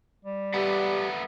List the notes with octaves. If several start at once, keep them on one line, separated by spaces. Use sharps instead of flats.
G3
A3 G4 B4 F#5